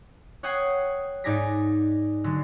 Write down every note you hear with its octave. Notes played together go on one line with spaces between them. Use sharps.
C#5 F#5 G5 D#6 G#6 C7
G#2 D#4 D5 G#5 A#6 B6
D3 F#3 G#3